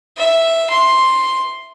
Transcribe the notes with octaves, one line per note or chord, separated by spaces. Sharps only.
E5
C6